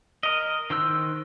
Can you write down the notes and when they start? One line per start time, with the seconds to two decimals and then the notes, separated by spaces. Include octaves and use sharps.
0.23 A#4 D#5
0.70 D#3 C5 E6 F#6